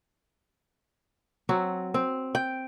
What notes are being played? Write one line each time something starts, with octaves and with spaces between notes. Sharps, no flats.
F#3 C4 F#4
C4
G5